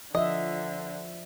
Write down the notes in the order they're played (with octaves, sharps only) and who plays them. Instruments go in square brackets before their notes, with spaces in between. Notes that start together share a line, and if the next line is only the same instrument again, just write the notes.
[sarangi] D3 [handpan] F3 E5 [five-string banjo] D#5